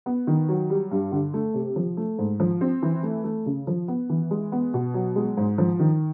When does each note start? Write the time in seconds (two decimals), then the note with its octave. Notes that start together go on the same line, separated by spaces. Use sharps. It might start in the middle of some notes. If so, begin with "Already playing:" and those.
0.06 B3
0.27 D#3
0.49 F#3
0.70 G3
0.91 G2
1.12 D3
1.34 A3
1.54 C3
1.76 F3
1.97 A3
2.19 G#2
2.40 F3
2.61 C4
2.82 E3
3.03 A3
3.24 A3
3.46 C#3
3.67 F3
3.88 B3
4.10 E3
4.31 G#3
4.52 B3
4.74 B2
4.94 F#3
5.16 G#3
5.37 G#2
5.58 F3
5.79 D#3